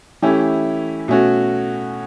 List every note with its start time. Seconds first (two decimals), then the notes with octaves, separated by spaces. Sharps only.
0.22 E3 A3 C#4 E4 G4
1.08 B2 A3 C#4 F#4